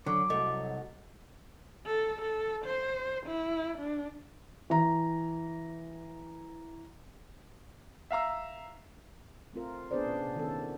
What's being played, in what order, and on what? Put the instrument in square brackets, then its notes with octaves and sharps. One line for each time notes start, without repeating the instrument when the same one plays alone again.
[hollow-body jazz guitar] D3 [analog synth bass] F#3 [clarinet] D6
[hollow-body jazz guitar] C2 A3 [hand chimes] D#5
[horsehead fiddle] A4
A4
C5
E4
D4
[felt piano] E3 A#5
[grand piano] E5 F5 A#5 E6
[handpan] A3 C4 F4 A#4
B3 D4 G#4 B4 C5 D5
A#2 C#4
C3
D#3 A3 B3 C#4 A4